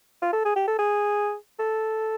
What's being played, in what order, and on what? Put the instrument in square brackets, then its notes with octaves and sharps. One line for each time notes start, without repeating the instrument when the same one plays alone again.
[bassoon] F4
A4
G#4
G4
A4
G#4
A4